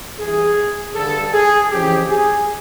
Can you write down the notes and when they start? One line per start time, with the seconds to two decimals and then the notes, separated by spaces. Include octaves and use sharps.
0.19 G2 E3 G#4
0.95 G2 D3 A4
1.32 G#4
1.70 F2 C#3 E3 G4
2.08 G#4